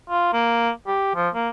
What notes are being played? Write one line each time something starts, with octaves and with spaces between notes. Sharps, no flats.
F4
A#3
G4
F3
A#3